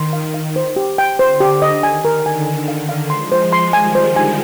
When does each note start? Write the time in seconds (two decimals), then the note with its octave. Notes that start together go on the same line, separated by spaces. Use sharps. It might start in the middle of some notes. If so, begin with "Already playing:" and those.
Already playing: D#3 C6
0.13 F5
0.34 F5
0.56 C5
0.76 G4
0.98 G5
1.19 D3 C5
1.40 G4
1.62 D#5
1.83 D#3 G#5
2.05 A#4
2.15 D3
2.26 G#5
2.46 D#3 G#5
2.68 F5
2.78 D#3
2.89 F5
3.10 F3 G#3 C6
3.32 C5
3.53 C6
3.73 D#3 G3 G#5
3.95 C5
4.06 D3 F3
4.16 G#5